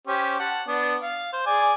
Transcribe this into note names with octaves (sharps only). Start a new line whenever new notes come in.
C#4 G4 C5
F#5 A5
B3 D4
F5
C5
G#4 D5 G#5